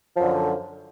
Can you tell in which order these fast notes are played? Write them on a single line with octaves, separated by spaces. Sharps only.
F3 F#2 D3